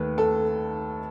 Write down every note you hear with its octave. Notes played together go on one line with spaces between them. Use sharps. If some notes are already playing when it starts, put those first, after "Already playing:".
Already playing: D#2 D#3 A3 B4
A4